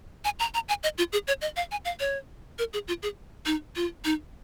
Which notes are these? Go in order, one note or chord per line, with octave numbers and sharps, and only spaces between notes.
G#5
A#5
A#5
G#5
D#5
F4
G#4
C#5
D#5
F5
G#5
F5
C#5
A#4
G#4
F4
G#4
D#4
F4
D#4